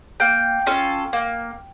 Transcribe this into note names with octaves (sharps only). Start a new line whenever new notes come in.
A#3 G5
C#4 F4 A4
A#3